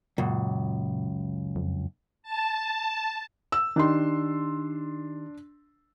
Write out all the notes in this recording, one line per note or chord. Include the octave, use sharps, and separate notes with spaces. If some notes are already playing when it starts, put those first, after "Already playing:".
C#2 F#2 A#2
F2
A5
E6
D#3 D4 D#4 G4 C6